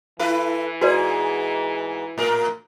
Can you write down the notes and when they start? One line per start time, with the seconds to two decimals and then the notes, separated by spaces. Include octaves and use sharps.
0.19 E3 E4 A4 B4
0.81 G#2 F#4 G#4 B4 D5
2.18 A2 A#4